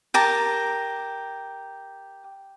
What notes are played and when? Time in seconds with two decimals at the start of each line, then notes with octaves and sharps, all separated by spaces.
0.14 G4 A#4 A5